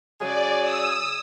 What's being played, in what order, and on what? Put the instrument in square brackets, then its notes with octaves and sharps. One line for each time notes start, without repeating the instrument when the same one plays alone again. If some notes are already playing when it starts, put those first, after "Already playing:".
[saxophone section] C#3 F#3 G#4 [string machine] D5
[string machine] D#6 E6